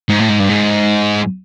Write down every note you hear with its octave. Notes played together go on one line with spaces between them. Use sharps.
G#2
A2
G#2
G2
G#2